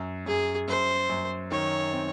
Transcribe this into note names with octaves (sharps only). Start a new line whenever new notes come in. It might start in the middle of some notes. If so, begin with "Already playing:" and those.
Already playing: F#2
F#2 G#4
F#2 C5
F#2
D#3 C#5
C4